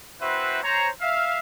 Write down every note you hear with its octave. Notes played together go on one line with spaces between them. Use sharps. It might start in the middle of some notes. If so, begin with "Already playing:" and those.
C4 E4 F#4 B4 C5 E5
C5 C#5 A#5
E5 F5